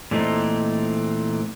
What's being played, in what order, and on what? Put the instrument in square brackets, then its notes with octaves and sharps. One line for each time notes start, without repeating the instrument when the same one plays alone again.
[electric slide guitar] A#2 E3 A3 C4 D#4